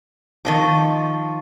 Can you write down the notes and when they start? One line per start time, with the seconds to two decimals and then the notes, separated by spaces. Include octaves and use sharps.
0.45 D#3 F3 D#5 A5 C#6 D6